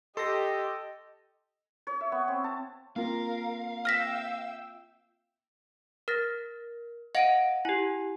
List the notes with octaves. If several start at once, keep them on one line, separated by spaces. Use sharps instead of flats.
G4 A4 D#5 C6 A#6
C#5
E5
B3
C4
A5
A#3 C4 F4 A#4 F5
E5 G5 E6 F6 A#6 B6
A#4 F6 A6 A#6
D#5 F5 F#5 A#6 D7 D#7
E4 G4 G#5